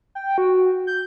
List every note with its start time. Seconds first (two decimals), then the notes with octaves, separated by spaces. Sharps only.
0.15 G5
0.38 F#4
0.87 G6